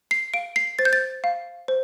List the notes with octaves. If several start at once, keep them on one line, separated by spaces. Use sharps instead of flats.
C7
F5 D7
C7
C5 A6
G6
A6
F5
C5